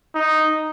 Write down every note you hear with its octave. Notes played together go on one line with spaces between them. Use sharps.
D#4